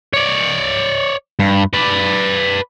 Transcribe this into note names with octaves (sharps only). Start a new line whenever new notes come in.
C#5 D5
G2
B4 D5